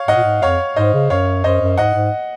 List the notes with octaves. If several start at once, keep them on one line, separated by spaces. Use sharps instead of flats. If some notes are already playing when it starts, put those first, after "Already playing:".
Already playing: C#5 F5
G#2 D#5 F#5
A#2
G#2
F2 C#5 F5
G#2 C5 D#5
C#3
F#2 C#5 F5
F#2 C5 D#5
F#2
G#2 D#5 F#5
G#2